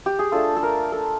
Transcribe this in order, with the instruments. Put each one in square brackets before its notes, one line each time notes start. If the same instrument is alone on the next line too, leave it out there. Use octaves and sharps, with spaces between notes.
[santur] G4
G#4
A3 D4 F4 A4
A4
A#4
A4